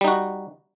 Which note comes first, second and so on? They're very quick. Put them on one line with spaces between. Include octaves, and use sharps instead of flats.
G3 D#4 F#4